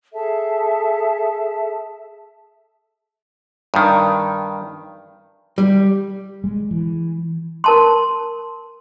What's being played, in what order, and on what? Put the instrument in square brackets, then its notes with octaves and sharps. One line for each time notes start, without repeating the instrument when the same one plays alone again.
[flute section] G#4 A4 E5 A5
[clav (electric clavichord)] G2 D#3
[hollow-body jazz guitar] G3
[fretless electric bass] G#3
E3
[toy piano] A#4 A5 C6